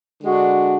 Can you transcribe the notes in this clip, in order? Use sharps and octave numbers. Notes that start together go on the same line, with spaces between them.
D3 G#3 D4 F#4